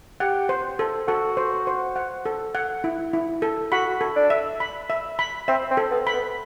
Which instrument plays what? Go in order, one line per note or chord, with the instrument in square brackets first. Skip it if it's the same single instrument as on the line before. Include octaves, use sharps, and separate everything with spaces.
[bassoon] G4 [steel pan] F#5
[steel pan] C5
A4
[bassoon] F#4 [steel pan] A4
[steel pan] C5
C5
F#5
A4
F#5
E4
E4
A4
[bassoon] F#4 [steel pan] B5
[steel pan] A4
[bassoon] D4
[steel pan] E5
B5
E5
B5
[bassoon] C4 [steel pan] E5
[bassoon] C4
[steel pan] A4
[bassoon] B3
[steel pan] B5
[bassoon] B3